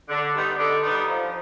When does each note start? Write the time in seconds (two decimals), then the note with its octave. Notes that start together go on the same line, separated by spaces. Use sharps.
0.09 D3
0.34 G3 B3 D#4
0.58 D3
0.84 G3 B3 D#4
1.08 F3